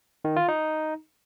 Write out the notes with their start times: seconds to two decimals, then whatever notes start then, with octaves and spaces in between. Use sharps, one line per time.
0.25 D#3
0.36 F4
0.48 D#4